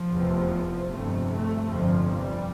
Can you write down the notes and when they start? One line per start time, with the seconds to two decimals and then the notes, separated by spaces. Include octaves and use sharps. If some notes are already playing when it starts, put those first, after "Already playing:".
Already playing: F3
0.11 F1 E2 C3
0.89 G1 F2 C3 A3
1.29 A3
1.68 G1 F2 C3 F3
2.08 G3